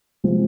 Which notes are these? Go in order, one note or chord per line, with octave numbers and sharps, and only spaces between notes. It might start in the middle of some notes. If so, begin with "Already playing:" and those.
C3 F3 G#3 C4